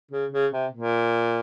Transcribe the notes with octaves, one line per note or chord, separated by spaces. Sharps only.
C#3
C#3
C3
A#2